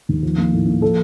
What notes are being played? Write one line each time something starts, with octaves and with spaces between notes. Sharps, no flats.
D#2
F3
A#3
A2
A#3
F3 A4